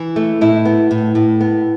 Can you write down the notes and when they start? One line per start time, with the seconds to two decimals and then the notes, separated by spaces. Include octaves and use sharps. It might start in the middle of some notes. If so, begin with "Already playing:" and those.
Already playing: E3
0.16 A3
0.41 A2 E4
0.65 B3
0.91 A2
1.15 A2
1.41 B3